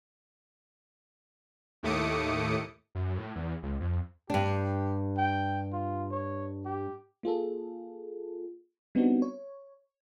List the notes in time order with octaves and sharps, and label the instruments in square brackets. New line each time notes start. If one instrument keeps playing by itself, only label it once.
[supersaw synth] D#2 A2 A3 D6 D#6 C#7
[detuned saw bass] F#2
A2
E2
C#2
F2
[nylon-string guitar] G2 D4 [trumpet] G4
[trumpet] G5
F4
C#5
G4
[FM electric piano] A#3 F4 G#4 A4
G3 B3 C4 D4 D#4 F#4
C#5